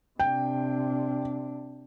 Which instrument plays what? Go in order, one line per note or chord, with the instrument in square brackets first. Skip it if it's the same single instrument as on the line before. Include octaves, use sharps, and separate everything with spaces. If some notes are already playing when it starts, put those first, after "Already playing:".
[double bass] C3 D4 [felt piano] G5